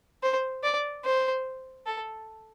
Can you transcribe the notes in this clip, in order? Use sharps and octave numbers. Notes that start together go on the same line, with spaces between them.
C5
D5
C5
A4